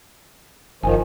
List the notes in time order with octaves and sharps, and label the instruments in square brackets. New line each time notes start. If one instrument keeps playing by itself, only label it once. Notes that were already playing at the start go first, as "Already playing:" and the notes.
[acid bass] F#1 [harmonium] D#3 F3 [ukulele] D#4 G#5 A5